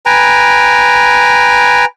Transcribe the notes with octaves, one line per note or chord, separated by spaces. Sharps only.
B4 G5 G#5 A#5